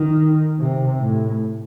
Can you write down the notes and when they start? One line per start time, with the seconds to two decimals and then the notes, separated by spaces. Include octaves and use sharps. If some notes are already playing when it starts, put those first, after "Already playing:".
Already playing: D#3
0.60 C3
1.00 A2